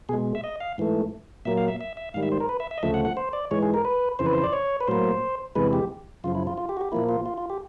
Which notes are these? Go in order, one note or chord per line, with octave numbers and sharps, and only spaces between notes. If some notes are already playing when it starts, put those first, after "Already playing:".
B2 G#3 G#4
E5
D#5
F5
G#2 E3 A3
A#2 F#3 A#3 E5
F5
E5
E5
E5
G#2 D#3 G3 F5
E5
C5
A#4
B4
E5
E5
D#5
D2 C#3 F3 A3 E5
F#5
F#5
C5
D5
G#2 E3 G#3 C#5
G#4
A#4
B4
F2 C#3 E3 C5
B4
C5
D5
C#5
B4
A2 F#3 A#3 C5
E2 C3 E3 G#3 B4
G4
F#2 C#3 F3 F4
E4
F4
F4
G4
F#4
G4
A#2 F3 A#3 E4
F4
F4
F4
G4